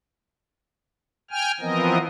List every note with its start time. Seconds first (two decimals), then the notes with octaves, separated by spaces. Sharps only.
1.31 G5 G#5 F6
1.61 E3 F3 B3 C4 A#4 D#5